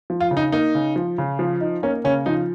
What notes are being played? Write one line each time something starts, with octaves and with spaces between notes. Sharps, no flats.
F3
F4
C#3
D#4
A#3 D#4
C#3
F3
C#3
F3
D#4
A#3 C#4
C#3 C#4
F3 D#4